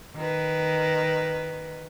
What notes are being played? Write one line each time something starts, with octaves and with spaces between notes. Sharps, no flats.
D#3 B4